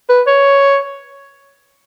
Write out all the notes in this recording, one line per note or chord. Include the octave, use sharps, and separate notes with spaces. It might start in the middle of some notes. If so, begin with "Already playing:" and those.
B4
C#5